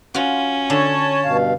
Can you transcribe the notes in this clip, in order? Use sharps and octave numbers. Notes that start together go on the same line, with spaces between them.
C#4 F4 F#4
D3 C#5 A5
G2 B2 F5